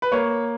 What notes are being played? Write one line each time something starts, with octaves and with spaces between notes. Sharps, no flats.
B4
A#3 C#5